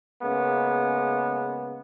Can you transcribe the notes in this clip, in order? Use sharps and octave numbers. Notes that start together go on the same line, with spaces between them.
C#3 G#3 A#3 B3